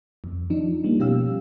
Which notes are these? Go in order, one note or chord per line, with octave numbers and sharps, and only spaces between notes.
F2
F3 D4 D#4
F3 G3 A#3
B2 C#4 G4 F5 E6